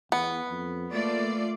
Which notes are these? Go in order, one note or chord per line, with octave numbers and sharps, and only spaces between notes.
E2 B3
F2
A3 A#3 F4 D5